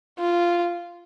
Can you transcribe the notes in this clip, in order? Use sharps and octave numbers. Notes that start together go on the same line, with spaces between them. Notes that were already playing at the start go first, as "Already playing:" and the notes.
F4